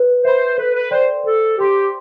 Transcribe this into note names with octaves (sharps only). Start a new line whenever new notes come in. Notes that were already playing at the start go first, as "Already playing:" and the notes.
Already playing: B4
C5 E5 B5
A4 B4
B4
C5 D5 G5 C6
A4 C5
G4 G5 C6